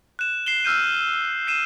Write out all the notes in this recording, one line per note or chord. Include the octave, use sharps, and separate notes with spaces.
F#6 E7
C7 E7 G7
E6 F6 G6 D#7
C7 D#7 E7